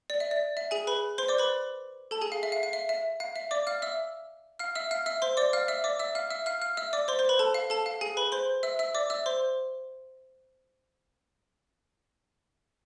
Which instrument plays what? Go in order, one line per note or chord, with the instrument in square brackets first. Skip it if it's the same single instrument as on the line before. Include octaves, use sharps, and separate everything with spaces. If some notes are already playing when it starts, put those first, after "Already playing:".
[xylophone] D5
E5
D5
E5
G#4 G#5
B4 B5
C5 C6
D5 D6
B4 B5
A4 A5
G#4 G#5
F5
E5
F5
F5
E5
E5
F5
E5
D5 D6
F5 F6
E5 E6
F5 F6
E5 E6
F5 F6
E5 E6
C5 C6
D5 D6
F5 F6
E5 E6
D5 D6
E5 E6
F5 F6
E5 E6
F5 F6
F5 F6
E5 E6
D5 D6
C5 C6
C5 C6
B4 B5
A4 A5
F5
A4 A5
F5
G#4 G#5
B4 B5
C5 C6
E5 E6
E5 E6
D5 D6
E5 E6
C5 C6